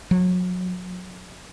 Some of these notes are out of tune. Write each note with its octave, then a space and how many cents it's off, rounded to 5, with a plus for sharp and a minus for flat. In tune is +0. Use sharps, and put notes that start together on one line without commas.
F#3 -30